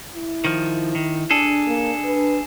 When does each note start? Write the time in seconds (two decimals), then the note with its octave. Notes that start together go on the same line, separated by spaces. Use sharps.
0.15 E4
0.45 D#3 F3
0.95 D#3
1.30 D4 G#4 A4
1.67 A#3
2.05 B4